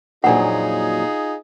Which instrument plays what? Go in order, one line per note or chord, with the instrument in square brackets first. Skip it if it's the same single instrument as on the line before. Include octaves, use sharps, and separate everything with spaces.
[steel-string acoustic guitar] F2 A#2 F#3 [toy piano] D4 F#5 [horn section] D#4 F4 G#4